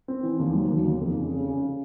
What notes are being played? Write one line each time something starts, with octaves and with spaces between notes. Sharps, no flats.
C4
E3
D#2
F#3
D#2
D#2
F2
C#3
C#3
C#3